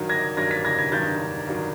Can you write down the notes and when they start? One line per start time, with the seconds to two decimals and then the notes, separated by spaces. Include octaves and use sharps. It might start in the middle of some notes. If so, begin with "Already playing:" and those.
Already playing: G2 D#3 F#3
0.09 G#6 A#6
0.37 G2 D#3 F#3 G#6 A#6
0.51 A6 B6
0.65 G#6 A#6
0.78 G#6 A#6
0.92 G2 D#3 F#3 G6 A6
1.47 G2 D#3 F#3